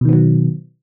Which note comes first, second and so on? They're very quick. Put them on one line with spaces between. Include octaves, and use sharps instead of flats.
B2 D#3 B3 F#3